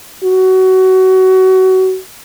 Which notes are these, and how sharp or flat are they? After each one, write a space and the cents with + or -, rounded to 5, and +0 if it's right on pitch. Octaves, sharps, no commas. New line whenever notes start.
F#4 +25